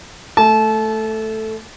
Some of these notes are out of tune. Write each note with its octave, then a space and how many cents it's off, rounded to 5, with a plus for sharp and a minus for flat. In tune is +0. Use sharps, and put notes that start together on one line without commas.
A3 +0 A5 -30